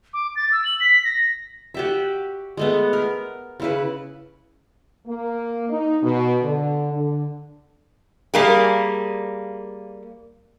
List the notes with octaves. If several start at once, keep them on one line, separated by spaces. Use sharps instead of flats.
D6
A6
E6
F#7
B6
A#6
F#4 G4 E5
G#3 A3 B3
A#4
C#3 E4 B4
A#3
D#4
B2
D3
D3
G3 A#3 G#4